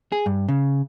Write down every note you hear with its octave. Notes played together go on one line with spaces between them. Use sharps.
G#4
G2
C#3